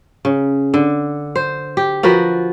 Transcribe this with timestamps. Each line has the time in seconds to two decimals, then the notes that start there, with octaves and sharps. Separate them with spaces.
0.25 C#3
0.74 D3
1.36 C5
1.77 G4
2.03 F3 F#4 A#4 B4